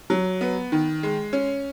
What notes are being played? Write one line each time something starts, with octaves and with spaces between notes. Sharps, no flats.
F#3
B3
D#3
G#3
C#4